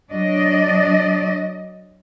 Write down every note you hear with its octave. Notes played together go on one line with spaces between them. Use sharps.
F#3 D4 D5 D#5